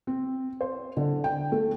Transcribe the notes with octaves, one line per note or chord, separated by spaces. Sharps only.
C4
C5
D3
G5
A3